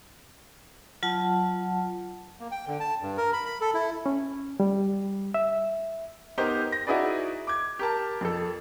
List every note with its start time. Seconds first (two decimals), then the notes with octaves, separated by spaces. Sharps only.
1.03 F#3 F4 F#5 A5
2.40 A#3
2.52 G5
2.67 D3
2.80 A5
3.02 G2
3.17 A#4
3.33 B5
3.46 B5
3.61 A4
3.74 E4
4.06 C#4
4.60 G3
5.34 E5
6.38 B3 D#4 G4 A#4 C5
6.72 A#6
6.87 D#4 E4 F#4 G#4 B4 D5
7.47 D6 G#6
7.79 G4 A#4 A5
8.21 F2 A4